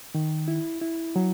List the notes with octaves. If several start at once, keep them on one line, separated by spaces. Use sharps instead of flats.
D#3
E4
E4
F#3